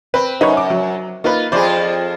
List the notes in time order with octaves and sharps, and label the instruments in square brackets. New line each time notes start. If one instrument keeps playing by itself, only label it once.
[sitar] C4 [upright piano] B4
[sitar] F#2 [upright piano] D#4 B4 C#5
[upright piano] D6
F#3
[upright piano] A#3 D#4 B4 [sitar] F4
[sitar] F2 F4 G#4 [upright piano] C5 D5 B5